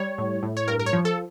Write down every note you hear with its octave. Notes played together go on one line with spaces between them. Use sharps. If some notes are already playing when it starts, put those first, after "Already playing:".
Already playing: G3 C#5
A2
A2
C#5
G2 A#4
A#4
C#5
F3
A4